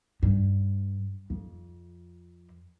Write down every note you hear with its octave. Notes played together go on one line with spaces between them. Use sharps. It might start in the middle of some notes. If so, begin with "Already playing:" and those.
G2
F2